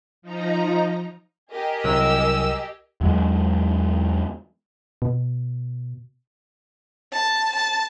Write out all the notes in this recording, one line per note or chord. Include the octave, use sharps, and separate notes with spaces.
F3 D#4 A#5
G4 G#4 A#4 D#5
C2 F#3 E6
E2 F#3 G#3
B2
A5
A5